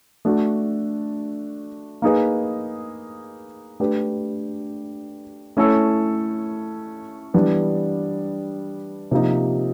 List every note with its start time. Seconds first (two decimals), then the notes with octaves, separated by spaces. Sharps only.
0.25 A3 D4 F#4
2.02 A#3 D#4 G#4 B4
3.80 A3 D4 G4 B4
5.57 A3 C#4 E4 A4
7.34 E3 G3 B3 D4
9.11 C3 F3 A#3 D#4